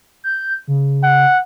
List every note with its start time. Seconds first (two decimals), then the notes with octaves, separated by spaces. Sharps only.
0.24 G6
0.67 C#3
1.03 F#5